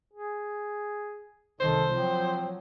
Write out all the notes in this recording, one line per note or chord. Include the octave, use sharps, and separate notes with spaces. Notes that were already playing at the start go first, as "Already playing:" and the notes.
G#4
C2 D#3 A4 C5
F3 F#3 C4